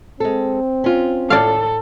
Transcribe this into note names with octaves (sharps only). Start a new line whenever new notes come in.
G#3 C4 A4
C#4 F4
A2 A4 D5 F5